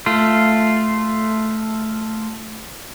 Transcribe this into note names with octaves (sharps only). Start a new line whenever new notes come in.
A3 F4